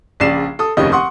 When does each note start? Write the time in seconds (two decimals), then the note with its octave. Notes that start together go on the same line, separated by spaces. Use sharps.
0.20 A#1 C#3 D5 C7 E7
0.59 A4 D#6
0.77 F1 D#2 C#3 C#4 D#4 D#5
0.92 F#5 C6 C#6 D#6